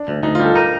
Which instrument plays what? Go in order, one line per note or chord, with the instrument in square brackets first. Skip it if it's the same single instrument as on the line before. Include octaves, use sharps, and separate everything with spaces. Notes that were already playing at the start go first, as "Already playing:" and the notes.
Already playing: [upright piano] D4
[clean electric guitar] D2
[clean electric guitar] D2 [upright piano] D#4
[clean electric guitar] G3 [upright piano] F4
[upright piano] A4
[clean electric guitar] D#4 [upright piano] A#4